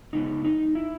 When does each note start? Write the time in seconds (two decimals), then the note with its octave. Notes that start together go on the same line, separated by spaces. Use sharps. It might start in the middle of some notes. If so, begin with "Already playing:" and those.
0.13 C#3 G#3 B3 D#4
0.45 D#4
0.75 E4